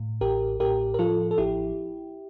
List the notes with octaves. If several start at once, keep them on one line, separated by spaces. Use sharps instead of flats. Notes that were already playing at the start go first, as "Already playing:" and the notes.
Already playing: A2
A1 G4 A#4
A2 G4 A#4
A#4
F3 F4 A4
A4
A1 E4 G4